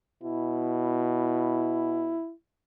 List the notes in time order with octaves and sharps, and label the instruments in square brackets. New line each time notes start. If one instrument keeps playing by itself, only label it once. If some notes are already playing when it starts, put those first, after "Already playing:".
[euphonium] B2 [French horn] E4